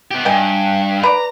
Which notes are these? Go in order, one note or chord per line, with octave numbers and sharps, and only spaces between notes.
B3 G4
G2 D#5 G5 G#5
B4 D5 A#5